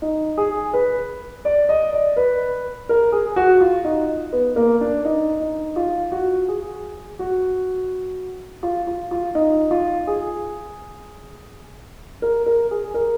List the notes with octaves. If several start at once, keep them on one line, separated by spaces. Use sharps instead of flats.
D#4
G#4
B4
D5
D#5
D5
B4
A#4
G#4
F#4
F4
D#4
B3
A#3
D4
D#4
D#4
F4
F#4
G#4
F#4
F4
F4
F4
D#4
F4
G#4
A#4
A#4
G#4
A#4